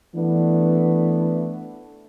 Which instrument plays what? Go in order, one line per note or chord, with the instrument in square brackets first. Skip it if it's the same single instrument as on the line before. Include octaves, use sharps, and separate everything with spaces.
[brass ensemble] E3 A3 B3 D4